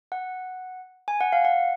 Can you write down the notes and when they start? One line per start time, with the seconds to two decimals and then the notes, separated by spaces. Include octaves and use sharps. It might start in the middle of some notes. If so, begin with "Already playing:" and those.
0.12 F#5
1.08 G#5
1.21 F#5
1.32 F5
1.45 F#5